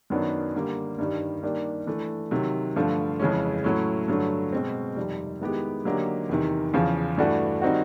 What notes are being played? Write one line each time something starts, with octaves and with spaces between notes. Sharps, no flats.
F#2 D#3 F#3 B3 D4
D3 G3 A#3
G2 D#3 G3
D#3 G3 A#3 D4 G4
E3 A3 D4
C3 D#3 F#3
G2 D3 F3 A3
F2 C#3 E3 G#3 C#4
A2 F#3 A3 C#4 E4
G2 D3 F#3 A3
B2 G#3 C4
F2 C3 D#3 G3
D#3 G#3 B3 E4 G4
D3 F#3 A#3 D#4 G4
E2 C3 D#3
E2 C#3 F3
G2 E3 A3 D4 F#4
D#3 G3 C4 D#4 F#4